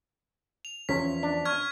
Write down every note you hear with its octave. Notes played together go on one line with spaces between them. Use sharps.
F7
E2 F3 C#4 B6
D4
C#6 F6 G#6